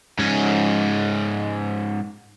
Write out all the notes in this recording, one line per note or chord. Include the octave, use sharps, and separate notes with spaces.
G#2 C#4